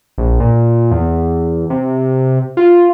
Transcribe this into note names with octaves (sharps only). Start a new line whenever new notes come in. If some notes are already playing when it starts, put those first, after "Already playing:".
A#1
A#2
E2
C3
F4